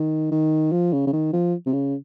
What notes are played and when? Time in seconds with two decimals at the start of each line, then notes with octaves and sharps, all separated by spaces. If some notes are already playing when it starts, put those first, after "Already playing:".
Already playing: D#3
0.32 D#3
0.72 F3
0.93 C#3
1.07 C#3
1.13 D#3
1.33 F3
1.66 C3
1.73 C#3